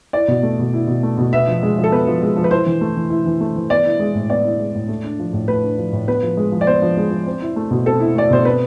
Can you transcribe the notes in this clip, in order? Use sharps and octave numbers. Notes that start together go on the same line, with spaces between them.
E4 D5
B2
A3
B2
E4
B2
A3
B2
B3 E5
F3
G#3
F3
A4
B3 B4
F3
G#3
F3
B4
E4 C5
E3
A3
E3
E4
E3
A3
E3
B3 D5
E4
G#3
A2
B3 D5
E4
G#3
A2
A3
D4
F3
A2
A3 B4
D4
F3
A2
B3 B4
F3
G#3
F3
D5
B3 C5
F3
G#3
F3
C4
E4
A3
B2
C4 A4
E4
A3 D5
B2 C5
C4 B4